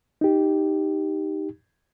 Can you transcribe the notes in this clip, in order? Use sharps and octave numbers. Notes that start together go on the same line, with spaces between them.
D#4 G4